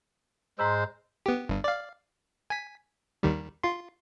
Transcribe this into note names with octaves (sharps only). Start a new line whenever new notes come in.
G#2 G#3 C5 A#5 E6
B3 G4
G1 G2
D5 F5
G#5 B6
D#2 D#3 G3
F4 C6